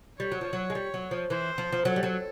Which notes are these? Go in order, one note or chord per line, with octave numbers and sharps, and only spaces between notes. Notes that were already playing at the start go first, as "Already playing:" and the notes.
G3 C#5
F#3
F3
F#3
G#3
G3
F#3
F3
E3 C5
F3
F3
F#3 A4
G3
F#3